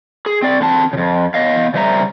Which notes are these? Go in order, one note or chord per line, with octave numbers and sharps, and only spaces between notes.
G#4
C4 D5
D3 C4 A5
F2 C#3
B3 D#5 F5
C#3 G3 C5 E5 A#5